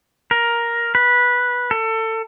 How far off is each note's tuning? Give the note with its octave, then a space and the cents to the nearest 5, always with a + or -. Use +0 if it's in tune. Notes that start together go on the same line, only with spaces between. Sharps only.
A#4 +10
B4 -10
A4 +25